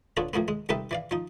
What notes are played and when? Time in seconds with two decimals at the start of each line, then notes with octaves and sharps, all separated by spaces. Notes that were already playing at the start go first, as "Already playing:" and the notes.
0.17 B3 D4 F4 A4 C#5
0.33 A2 F3 A#3 B3
0.48 G#3
0.69 C2 D#4 G4 A4 B4 E5
0.91 E3 D5 F5
1.11 F3 D#4